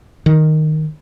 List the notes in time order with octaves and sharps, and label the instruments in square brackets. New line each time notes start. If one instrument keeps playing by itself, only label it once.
[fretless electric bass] D#3